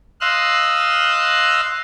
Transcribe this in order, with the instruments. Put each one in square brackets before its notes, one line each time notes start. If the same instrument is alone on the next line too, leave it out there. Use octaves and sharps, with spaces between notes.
[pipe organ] D#5 F5 C6 E6 F#6